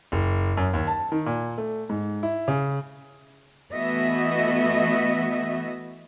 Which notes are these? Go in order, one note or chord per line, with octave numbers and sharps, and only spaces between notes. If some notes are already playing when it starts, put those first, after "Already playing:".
F#1
F#2
D#2
A5
D#3
A#2
A3
G#2
E4
C#3
E3 A3 B3 F#4 D#5 E5